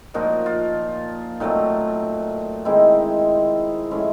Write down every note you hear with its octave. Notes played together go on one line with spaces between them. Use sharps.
A#2 F3 A#3 D#4 F#4
F4
A#2 F#3 A3 C4 D#4
D#3 G#3 C4 D#4 E4
A2 F3 G#3 C#4 E4